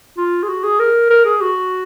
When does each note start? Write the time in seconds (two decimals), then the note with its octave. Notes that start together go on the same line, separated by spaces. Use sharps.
0.17 F4
0.43 G#4
0.49 F#4
0.64 G#4
0.80 A#4
1.10 A#4
1.25 G#4
1.41 F#4